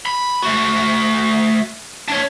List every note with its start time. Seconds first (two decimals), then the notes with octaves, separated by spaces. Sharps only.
0.06 B5
0.43 A3 F#4
2.08 D4 C#5